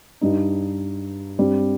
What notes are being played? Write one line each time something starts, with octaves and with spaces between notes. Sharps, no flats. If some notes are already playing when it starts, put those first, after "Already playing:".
G2 G3 D#4
G2 G3 C4